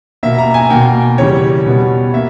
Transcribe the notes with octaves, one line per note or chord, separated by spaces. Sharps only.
B2 A#3 E5
A#5
G#5
B2 A#3 G5
E2 C#3 G3 C#5
B2 G3 B3
A#3 E5